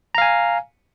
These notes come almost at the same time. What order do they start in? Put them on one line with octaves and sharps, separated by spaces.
A#5 F5 G#5